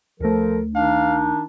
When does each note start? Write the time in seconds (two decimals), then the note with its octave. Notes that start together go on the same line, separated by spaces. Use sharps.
0.20 D2 F3 A3 A4 A#4
0.75 D#3 D4 D#4 F5